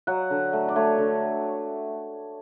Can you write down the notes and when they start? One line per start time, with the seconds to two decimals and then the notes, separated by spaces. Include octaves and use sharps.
0.07 F#3 F#5
0.30 D3
0.53 A3
0.68 D5
0.76 A3 C#5
0.98 D3